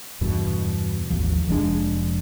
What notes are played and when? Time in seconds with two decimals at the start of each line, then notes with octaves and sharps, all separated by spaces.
0.21 E2 G2 B2 B3
1.10 G#1 D#2 F3
1.47 F1 F3 G#3 D4